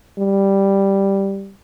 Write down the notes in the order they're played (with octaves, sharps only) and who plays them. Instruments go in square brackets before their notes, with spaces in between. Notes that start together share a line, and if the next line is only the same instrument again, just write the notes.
[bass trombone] G3